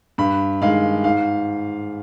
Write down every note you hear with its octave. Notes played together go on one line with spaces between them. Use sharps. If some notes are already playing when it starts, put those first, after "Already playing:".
G2 B5
D#3 G#3 F5
G#2 F5